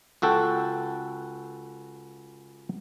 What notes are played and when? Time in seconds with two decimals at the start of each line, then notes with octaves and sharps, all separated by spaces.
0.22 C#2 F#4 A4 G5